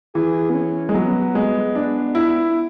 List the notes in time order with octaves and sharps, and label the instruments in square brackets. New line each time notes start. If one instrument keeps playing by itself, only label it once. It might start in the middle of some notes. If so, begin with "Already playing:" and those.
[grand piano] E3 [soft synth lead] G#4
[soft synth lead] B3
C#4
[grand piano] G#3
[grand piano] F#3 [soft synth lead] B3
[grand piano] G#3
D4
E4